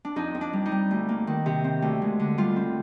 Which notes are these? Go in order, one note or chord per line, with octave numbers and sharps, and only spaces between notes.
D4
F2 D#4
F2
D4
G3
D#4
G3
D2
A#3
D#3
C3
C4
D2
G#3
D3
G3 F4
C4